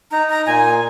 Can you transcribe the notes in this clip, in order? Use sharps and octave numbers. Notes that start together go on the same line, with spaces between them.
D#4 A#5
A#5
A#2 G#5